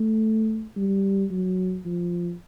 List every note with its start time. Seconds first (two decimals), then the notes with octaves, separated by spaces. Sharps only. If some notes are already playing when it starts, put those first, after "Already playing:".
Already playing: A3
0.76 G3
1.31 F#3
1.85 F3